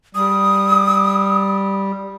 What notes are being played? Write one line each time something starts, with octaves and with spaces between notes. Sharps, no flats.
G3 D#6